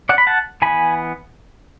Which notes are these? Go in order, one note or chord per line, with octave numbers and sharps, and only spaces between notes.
D5 F#5
B5
F#5 A5
E3 B3 G#5 B5